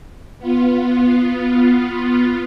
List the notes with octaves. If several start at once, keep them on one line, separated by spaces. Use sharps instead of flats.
B3 F4